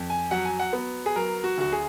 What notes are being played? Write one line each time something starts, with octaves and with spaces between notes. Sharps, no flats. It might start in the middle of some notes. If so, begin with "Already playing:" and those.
Already playing: F2
G#5
F#3 F#5
G#5
F#5
B3
G#4
F#3 A#4
F#4
D2 F#4
G#4